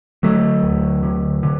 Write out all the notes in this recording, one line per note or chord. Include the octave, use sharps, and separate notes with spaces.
D3 F#3 A3
D2
D3
D3